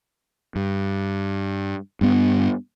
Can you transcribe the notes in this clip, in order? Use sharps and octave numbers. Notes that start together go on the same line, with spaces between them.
G2
G2 B3